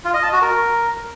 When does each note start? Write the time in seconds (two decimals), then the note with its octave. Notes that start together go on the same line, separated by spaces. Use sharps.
0.04 F4
0.14 D#5
0.23 A5
0.32 F#4
0.42 A#4